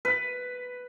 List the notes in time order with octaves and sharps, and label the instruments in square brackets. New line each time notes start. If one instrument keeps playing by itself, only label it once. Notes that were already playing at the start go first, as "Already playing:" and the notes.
[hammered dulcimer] B4